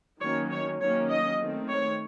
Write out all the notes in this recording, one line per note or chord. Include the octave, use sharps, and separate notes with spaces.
D#3 F#3 A#3 C#4 C#5
C#5
D#3 F#3 A#3 C#4 C#5
D#5
D#3 A3 C4
C#5